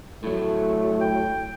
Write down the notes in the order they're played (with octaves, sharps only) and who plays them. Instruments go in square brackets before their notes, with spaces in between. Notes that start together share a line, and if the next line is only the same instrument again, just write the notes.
[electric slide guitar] A2 F#3 [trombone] A3
[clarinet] G5